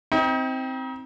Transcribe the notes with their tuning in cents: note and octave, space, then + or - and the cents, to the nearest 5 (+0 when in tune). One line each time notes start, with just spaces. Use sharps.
C4 +0 D#4 +35